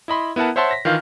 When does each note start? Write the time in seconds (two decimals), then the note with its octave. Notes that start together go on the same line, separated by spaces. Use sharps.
0.08 E4 D#5 B5 C6
0.36 B3 E4 A#4 F#5 A5
0.56 C5 C#5 E5 F#5 A5 C6
0.71 A#6 B6
0.85 D#3 E3 F4 F5 F6 G6